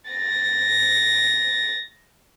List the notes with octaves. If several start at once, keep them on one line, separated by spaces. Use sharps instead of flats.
A6 A#6